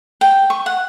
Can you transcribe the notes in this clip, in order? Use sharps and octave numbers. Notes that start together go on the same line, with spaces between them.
G5
C#6
F#5